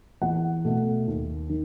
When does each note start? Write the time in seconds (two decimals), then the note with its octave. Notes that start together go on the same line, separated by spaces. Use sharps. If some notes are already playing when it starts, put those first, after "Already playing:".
0.22 E2 F#5
0.65 B2 A3
1.08 D#2
1.49 D#3